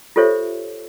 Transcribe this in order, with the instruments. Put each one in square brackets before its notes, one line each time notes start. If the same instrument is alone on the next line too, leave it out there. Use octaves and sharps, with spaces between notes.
[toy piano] F4 G4 A4 C5 C#5 E5